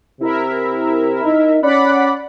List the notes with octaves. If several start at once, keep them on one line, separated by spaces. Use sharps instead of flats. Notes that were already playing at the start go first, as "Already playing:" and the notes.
C3 E4 A#4 E5
D#4
C#4 D5 F#5 B5